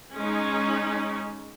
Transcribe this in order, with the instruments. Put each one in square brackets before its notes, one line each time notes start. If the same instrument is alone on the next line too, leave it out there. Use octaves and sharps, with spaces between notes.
[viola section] G#3 C#4 D#4